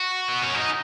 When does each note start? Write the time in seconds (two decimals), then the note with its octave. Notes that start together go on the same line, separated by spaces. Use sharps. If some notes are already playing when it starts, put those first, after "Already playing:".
Already playing: F#4
0.28 B3
0.42 C#4
0.54 D#4